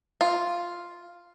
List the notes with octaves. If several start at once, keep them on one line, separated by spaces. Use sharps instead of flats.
F4